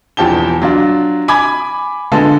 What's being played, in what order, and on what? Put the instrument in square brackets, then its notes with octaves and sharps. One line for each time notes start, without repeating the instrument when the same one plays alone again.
[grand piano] E1 E2 F3 G4 A5 G7
F#3 D4 F4
G#5 B5 D6 G#6
D3 G#3 B3 F4 A4